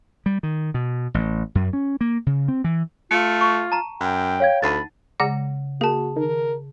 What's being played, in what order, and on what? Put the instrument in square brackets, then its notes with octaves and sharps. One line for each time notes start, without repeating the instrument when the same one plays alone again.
[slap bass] G3
D#3
B2
A1
F#2
C#4
A#3
C#3
C4
E3
[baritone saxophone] A3 [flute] F4 [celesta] C#7
[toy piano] C#6
A5 A#5
[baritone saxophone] F#2 [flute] G5
[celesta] C#5 F5 G#6
[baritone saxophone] D2 [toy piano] D#4 F#5 A5 [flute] B5 [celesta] A6
[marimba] C#3 [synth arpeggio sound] G#3 D5 A#5 [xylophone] F#5
[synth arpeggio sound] A#3 [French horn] F#4 [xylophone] G#4 A5
[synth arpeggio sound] D#3 [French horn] A#4